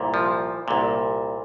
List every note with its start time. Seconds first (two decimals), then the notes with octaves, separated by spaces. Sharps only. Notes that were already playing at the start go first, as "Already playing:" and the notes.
Already playing: C2 A#2
0.14 F3
0.68 C2 A#2